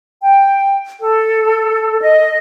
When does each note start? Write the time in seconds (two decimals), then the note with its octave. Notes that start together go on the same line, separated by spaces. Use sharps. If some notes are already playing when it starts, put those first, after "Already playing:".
0.22 G5
1.00 A4
2.01 D#5